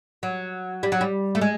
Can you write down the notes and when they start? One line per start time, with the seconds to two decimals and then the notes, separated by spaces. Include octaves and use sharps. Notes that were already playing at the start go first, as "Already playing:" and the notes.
0.23 F#3
0.83 G3
0.92 F#3
1.01 G3
1.35 A3
1.41 G#3